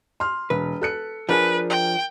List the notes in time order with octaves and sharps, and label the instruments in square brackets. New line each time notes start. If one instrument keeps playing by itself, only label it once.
[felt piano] C6 F6
[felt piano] E1 [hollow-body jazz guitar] B4
[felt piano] A4 F#6 C#7
[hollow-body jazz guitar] F3 D4 G#4 [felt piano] A#4 [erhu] B4
[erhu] G5